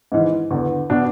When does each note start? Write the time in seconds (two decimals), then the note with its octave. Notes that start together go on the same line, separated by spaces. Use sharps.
0.12 G#2 E3
0.51 E2 D3
0.90 B2 D4